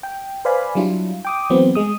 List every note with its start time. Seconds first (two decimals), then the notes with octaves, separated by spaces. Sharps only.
0.03 G5
0.45 B4 C5 D5 F5 G#5 B5
0.75 F#3 G3 D4 E4 F4
1.25 G5 D6 D#6
1.50 E3 F#3 A3 B3 C4
1.75 G#3 D#6